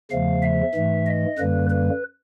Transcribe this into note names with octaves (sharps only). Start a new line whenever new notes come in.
E2 C#3 F3 A3 F5
E5
G#2 E3 A3
D#5
F#2 D3 G3 A#3 B4
B4